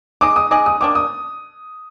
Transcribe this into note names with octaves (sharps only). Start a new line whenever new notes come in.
G#3 D#4 G#4 D#5 D6
D#6
G#3 D#4 G#4 D#5 D6
D#6
D#3 A#3 D4 D6
D#6